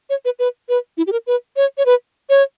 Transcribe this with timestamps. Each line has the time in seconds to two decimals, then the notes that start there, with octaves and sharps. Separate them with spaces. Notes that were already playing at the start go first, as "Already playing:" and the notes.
0.10 C#5
0.25 B4
0.39 B4
0.69 B4
0.97 E4
1.07 G4
1.12 A#4
1.27 B4
1.56 C#5
1.78 C#5
1.86 B4
2.29 C#5